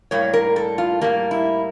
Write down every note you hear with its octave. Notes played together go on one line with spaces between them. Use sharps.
A2 G3 A#3 C#5
A#4
A4
F4
A2 G3 A#3
E4